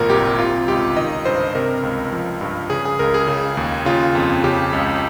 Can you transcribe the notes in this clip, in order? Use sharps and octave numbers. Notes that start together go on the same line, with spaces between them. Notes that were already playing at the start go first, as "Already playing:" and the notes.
Already playing: G#1 A#2 A#4
C2 G4
C3 F4
C#2 G4
D#3 D#5
G2 C5
C3 A#4
C#2
F3
G2
C#3 G#4
G#4
C#2 A#4
G#4
C#3
D#2
C#3 F4
F2
C#3 G4
C#2